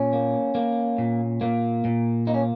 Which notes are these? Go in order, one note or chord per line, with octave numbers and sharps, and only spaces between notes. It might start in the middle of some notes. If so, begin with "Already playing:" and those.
Already playing: A#2 C#4
A#3
A#3
A#2
A#2 A#3
A#2
A#3 D#4
C#4